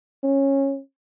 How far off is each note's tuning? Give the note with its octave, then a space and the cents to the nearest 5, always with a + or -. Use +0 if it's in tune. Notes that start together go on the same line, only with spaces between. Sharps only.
C#4 -15